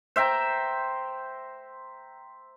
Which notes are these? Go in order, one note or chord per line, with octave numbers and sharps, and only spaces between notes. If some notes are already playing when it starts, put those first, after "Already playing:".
C5 E5 G5 A#5